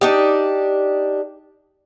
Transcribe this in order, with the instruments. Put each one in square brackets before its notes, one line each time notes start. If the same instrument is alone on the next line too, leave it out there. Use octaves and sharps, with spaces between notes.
[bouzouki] D4 D#4 G4